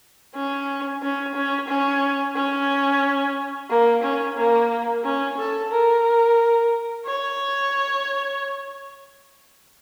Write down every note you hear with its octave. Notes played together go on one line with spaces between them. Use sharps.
C#4
C#4
C#4
C#4
C#4
A#3
C#4
A#3
C#4
A4
A#4
C#5